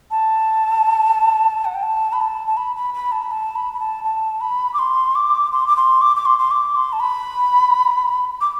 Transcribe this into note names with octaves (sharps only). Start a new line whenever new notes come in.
A5
F#5
G5
A5
B5
A5
A5
B5
B5
B5
A5
B5
A5
B5
B5
A5
A5
B5
D6
C6
D6
C6
D6
C6
D6
D6
C6
C6
D6
C6
A5
B5
D6